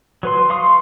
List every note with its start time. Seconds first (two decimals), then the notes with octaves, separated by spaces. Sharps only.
0.23 F#3 B4 C6
0.50 F5 C6 C#6 D#6